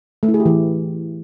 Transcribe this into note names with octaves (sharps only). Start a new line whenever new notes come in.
A3
E4
G#4
G4
E3